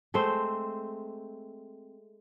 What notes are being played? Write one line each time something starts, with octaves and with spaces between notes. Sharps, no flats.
G#3 A3 C4 C5